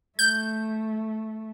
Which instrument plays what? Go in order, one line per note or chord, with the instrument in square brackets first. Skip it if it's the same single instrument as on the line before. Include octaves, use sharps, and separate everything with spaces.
[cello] A3 [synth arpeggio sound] G6